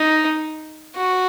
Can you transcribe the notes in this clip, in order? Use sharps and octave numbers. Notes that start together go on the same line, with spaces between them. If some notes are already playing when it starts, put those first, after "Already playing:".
Already playing: D#4
F#4